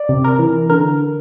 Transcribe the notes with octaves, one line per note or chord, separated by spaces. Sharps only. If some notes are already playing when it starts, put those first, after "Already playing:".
Already playing: D5
C3
A#4
E3
D3 A#4